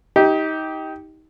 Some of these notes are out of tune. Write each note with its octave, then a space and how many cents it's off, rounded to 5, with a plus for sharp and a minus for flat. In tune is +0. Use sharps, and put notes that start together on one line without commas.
D#4 +25 G4 -5